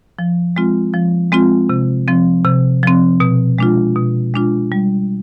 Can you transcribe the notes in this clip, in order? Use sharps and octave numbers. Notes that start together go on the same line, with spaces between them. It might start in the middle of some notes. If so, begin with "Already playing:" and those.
F3
G#3 C4 F4
F3
G#3 C4 F4
C3
F3 C4
C3
F3 C4
B2
G#3 D4 F4
B2
G#3 D4 F4
G3